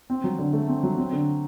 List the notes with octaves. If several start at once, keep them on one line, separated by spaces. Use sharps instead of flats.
C4
F#3
D3
A3
C4
F#3
C4
D3